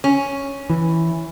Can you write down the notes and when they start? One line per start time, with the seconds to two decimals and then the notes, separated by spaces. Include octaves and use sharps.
0.04 C#4
0.70 E3